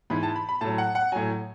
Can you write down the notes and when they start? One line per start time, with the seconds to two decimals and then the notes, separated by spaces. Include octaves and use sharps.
0.10 G#2 E3 B5
0.23 A5
0.36 B5
0.49 B5
0.61 A2 F#3 A5
0.78 F#5
0.95 F#5
1.12 A2 F#3 G#5